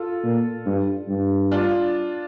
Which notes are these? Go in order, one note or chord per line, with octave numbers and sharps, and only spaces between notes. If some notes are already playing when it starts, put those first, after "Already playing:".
Already playing: F4 A4
A#2
G2
G2
D4 F4